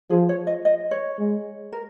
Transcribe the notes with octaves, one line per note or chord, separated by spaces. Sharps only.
F3 G#4
C#5
D#5
D#5
C#5
G#3
A#4